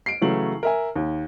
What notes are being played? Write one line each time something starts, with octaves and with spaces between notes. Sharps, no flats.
C7 D7
C#3 E3 F#3 A3 F#7
A#4 E5 G#5
D#2